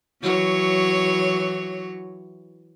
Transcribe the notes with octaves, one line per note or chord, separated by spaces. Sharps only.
E3 F#3 C#5